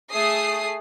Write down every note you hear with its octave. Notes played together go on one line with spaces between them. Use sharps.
A3 G#4 A5 D#6 C7